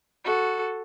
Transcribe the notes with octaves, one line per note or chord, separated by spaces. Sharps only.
F#4 A4